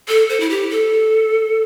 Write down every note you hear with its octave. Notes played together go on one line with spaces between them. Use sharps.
A4
C5
E4
G4
A4